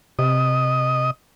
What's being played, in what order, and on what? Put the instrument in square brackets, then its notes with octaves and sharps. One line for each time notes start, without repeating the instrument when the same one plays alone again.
[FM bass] C3 [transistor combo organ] D#5